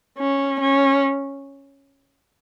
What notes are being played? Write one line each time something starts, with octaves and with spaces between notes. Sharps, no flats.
C#4
C#4